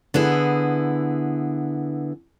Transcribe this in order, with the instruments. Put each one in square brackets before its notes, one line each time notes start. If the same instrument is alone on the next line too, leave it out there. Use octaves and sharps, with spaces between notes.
[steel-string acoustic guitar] D3 B3 E4 G#4